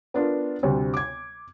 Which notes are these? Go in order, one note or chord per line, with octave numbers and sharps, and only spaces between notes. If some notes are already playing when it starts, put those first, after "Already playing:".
B3 D4 F4 A#4
D2 C3 G3
D6 G#6